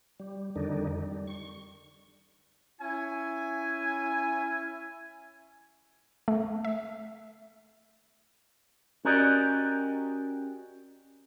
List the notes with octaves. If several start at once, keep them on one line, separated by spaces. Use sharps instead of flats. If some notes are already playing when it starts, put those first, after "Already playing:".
G3
F2 D3 D#3 G3 D4 D#4
G3
C#6
C#4 E4 E5 G#5
A3
E5
C#4 F#4 G4 A#4 D5 D#5